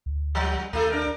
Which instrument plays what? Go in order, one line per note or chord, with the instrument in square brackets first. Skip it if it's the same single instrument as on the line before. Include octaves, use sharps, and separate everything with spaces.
[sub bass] D2
[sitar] F3 G3
[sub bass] D#2 [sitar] A3 E4 A4
[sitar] D4 A#4